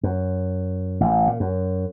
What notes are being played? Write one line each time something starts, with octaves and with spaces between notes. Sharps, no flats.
F#2
A1
A#2
F#2